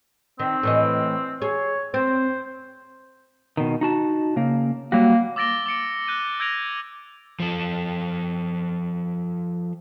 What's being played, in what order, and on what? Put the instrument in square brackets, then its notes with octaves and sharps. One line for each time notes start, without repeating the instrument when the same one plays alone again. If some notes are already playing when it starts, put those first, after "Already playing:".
[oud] D#3 [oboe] C4
[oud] A2 E3 D#5
[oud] G#4 [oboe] C#5
[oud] C4 [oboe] C5
[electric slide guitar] B2 D#3
D#4 F#4 A5
C#3 A#3
[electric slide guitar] F#3 G3 F#4 [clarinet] A#3
[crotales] D6 E6 A6 A#6 D7 G7
D6 A6 C#7 D7
F#6 G6 D#7
E6 G6 G#6 A#6 D7 F7
[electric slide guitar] F3 A4